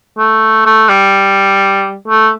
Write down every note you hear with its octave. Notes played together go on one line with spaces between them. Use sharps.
A3
A3
G3
A3